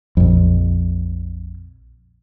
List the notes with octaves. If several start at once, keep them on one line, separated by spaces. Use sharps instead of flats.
A#1 F2